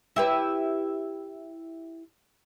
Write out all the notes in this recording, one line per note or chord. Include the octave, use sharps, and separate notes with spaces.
E4 G4 B4